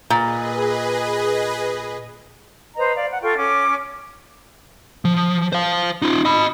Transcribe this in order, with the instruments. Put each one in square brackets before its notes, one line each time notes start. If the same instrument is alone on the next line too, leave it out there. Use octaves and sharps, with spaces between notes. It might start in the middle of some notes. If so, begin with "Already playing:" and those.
[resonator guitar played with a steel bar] A#2 [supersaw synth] G#4 B4 D#5
[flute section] B4 C5 D#5 A#5
D5 F5
F#5
F4 A4 G5 C#6
C#4 D6
[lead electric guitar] F3
C5 F5
D#4 F4
D#5 B5